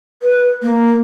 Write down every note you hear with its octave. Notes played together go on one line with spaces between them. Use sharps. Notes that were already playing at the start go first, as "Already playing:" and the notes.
B4
A#3